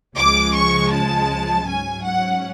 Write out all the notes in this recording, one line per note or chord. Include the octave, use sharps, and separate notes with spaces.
C#2 C#3 F3 G#3 D6
C#6
A5
G#2 F#3 C#4 G#5
F#5